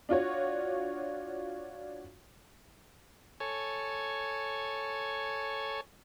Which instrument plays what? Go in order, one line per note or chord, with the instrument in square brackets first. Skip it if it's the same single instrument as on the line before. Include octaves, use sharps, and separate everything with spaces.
[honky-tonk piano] D4 F4 F#4 C#5
[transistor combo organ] A4 C#5 G#5